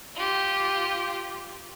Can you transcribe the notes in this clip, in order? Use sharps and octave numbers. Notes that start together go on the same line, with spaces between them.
F4 G4